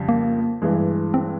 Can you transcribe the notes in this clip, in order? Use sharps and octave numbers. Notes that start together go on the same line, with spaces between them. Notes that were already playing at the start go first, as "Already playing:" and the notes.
Already playing: F2 C#3 G3
A#3
G2 E3 G#3
C4